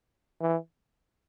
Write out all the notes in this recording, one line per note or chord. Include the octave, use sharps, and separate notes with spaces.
E3